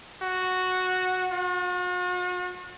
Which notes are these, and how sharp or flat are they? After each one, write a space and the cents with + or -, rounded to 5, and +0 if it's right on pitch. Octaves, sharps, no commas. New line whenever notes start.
F#4 -5
F#4 -45